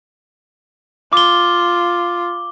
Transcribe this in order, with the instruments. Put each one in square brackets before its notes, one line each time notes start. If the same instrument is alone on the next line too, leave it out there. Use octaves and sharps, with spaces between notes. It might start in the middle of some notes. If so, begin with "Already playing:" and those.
[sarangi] F4 [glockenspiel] D6 G7